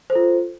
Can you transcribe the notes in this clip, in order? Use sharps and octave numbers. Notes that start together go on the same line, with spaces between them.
F4 A4 C5